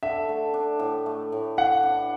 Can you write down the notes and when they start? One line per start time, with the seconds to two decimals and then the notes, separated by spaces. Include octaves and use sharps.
0.03 D3 E5
0.29 A3
0.54 D4
0.79 A2
1.06 A3
1.32 A2
1.57 E3 F#5
1.83 D4